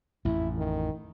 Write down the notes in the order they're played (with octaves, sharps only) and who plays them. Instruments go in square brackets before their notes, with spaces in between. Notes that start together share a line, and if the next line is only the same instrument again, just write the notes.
[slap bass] A1 F2 [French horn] E4
[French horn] D#3